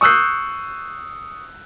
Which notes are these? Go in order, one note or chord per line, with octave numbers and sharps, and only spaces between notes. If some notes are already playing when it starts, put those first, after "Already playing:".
C#6 D#6 E6 F#6 G6 C7